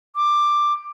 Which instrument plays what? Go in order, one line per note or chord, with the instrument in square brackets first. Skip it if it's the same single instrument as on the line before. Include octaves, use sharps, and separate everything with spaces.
[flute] D6